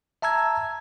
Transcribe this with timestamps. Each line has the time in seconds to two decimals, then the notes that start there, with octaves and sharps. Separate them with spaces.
0.22 E5 A5 A#5 E6 G#6